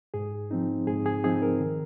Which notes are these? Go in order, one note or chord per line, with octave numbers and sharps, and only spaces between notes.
G#2 G#4
F3 C4 D#4
G#2 G#4
G#4
F3 C4 D#4 G#4
A#4
D#3